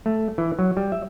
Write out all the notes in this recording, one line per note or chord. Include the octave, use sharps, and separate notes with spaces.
A3
E3
F#3
G3
E5